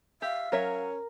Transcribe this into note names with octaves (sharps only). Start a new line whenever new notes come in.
G4 E5 F5
F#3 C#4 A#4 C#5 E5